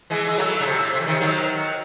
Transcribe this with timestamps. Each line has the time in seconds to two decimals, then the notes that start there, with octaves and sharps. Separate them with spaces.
0.10 E3 G#3
0.27 G#3
0.38 F#3 A3
0.61 C#3
0.65 C3
0.79 A2
0.93 C3
1.00 E3
1.07 C3 D#3
1.20 D#3 F#3